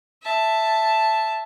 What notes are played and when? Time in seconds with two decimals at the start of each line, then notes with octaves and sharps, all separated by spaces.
0.23 E5 A5